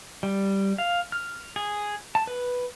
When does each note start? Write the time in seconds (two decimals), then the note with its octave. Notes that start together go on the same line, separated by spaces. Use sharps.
0.23 G3
0.78 F5
1.12 F6
1.56 G#4
2.15 A5
2.27 B4